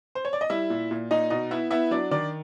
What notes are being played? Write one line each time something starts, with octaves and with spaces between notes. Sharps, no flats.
C5
C#5
D5
D#5
G3 E4 E5
A#2
A#2
A#2 D#4 D#5
B2 D#4 D#5
B3 E4 E5
B3 E4 E5
F#3 D4 D5
D#3 D4 D5